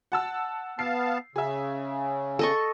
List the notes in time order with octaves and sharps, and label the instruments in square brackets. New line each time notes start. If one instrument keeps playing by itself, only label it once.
[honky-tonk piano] F#5 A5 E6
[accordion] B3 F5 A5 [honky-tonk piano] C7
[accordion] C#3 [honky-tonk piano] G#4 E5
[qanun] A4 D#5 C#6